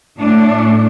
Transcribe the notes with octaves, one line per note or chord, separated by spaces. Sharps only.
A2 A3 D4